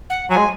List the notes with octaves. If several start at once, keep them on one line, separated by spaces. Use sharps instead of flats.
F#5
F#3 G#5
G#3